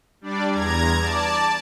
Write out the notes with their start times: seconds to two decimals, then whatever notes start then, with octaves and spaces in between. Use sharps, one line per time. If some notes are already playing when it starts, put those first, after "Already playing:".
0.21 G3 D4 D5
0.50 E2 A#5 G#6
0.98 D5 A5